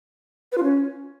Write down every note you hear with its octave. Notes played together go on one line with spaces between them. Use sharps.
B4
F4
C#4